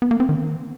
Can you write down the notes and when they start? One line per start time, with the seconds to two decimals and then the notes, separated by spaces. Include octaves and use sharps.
0.02 B3
0.11 A#3
0.20 C4
0.29 D#3